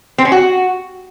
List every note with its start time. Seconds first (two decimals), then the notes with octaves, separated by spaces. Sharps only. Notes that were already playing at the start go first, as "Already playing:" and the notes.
0.18 C4
0.25 C#4
0.32 F#4